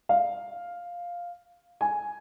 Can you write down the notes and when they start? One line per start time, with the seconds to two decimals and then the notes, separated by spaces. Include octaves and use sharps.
0.09 F5
1.81 G#5